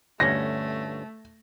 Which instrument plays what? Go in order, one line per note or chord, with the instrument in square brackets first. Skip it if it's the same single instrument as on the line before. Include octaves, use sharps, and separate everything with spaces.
[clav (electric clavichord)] G1 D2 C#4 [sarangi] A3 [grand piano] A#6